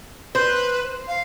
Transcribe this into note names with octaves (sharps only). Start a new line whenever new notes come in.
B4 C5
F5